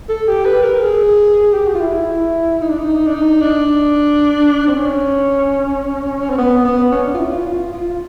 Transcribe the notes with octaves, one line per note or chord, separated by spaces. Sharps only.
A4
G4
B4
A#4
G#4
G4
F#4
F4
E4
E4
D#4
D4
D#4
D4
D#4
D4
C4
C#4
C4
B3
B3
C#4
D4
F4
E4
F4
F4
F4